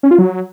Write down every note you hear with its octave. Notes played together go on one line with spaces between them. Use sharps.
C#4
F4
F#3